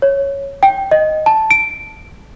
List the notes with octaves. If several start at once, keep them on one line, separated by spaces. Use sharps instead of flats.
C#5
G5
D#5
A5
D7